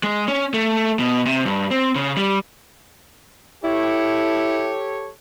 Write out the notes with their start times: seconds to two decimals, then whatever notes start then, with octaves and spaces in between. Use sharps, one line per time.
0.03 G#3
0.28 C#4
0.54 A3
0.99 B2
1.26 C3
1.46 G2
1.71 C4
1.95 C#3
2.17 G3
3.64 E4 G4 A4 C#5